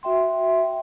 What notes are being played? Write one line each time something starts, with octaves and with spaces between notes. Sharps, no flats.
F#4 E5 G5 C6